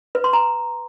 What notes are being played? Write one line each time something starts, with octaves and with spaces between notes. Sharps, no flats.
B4
C6
A#5